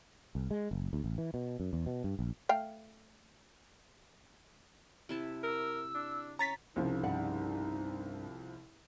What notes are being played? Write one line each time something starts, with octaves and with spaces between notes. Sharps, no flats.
C2
G#3
F#1
D2
A1
E3
B2
F#2
E2
B2
G2
A#1
A3 F5 G5
C3 E4 A5
A#4 E6
D4
C#4 A#5 A6 B6
C2 C#3 F3 D#4
G2 D5 F#5